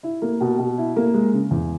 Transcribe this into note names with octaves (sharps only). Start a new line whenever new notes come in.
E4
A#3
B2
B2
E4
A#3
G#3
C#3
E2